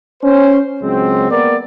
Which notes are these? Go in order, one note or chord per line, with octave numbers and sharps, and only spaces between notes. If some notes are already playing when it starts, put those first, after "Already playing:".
C#4 C5
C#2 F#3 G#3 C4
A#3 B3 A#4 D5